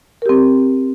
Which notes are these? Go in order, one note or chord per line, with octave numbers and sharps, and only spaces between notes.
C4 G4 A#4